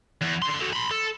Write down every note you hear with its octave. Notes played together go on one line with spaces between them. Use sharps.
E2
D3 C6
F#4 A4
B5 C6
A4